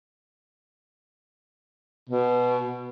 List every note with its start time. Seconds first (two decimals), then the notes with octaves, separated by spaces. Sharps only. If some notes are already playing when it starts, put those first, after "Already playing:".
2.09 B2